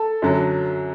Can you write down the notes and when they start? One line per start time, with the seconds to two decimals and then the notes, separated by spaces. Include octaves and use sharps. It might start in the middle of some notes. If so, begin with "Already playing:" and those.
Already playing: A4 A5
0.22 F#2 D3 F#3